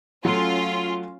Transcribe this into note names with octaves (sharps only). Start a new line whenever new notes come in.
F#3 A3 C#4 F4